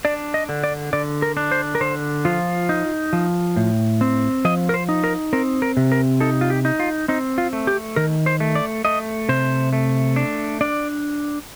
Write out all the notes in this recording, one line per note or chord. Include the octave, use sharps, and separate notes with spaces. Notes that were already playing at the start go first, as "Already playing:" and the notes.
D4 D5
D#5
D3
D5
D3 D5
A#4
D4
C5
A#4
D3 C5
F3 F4
D#4
F3
A2
C4
F3 D#5
A#4
C5
D#4
A#4
C4 A#4
A#4
C3
A#4
D#4 A4
F4
G4
D#4
F4
C4 D#4
F4
A3
G4
D#3 A#4
C5
A3
D5
A3 D#5
C3 C5
A3
D4
D4 D5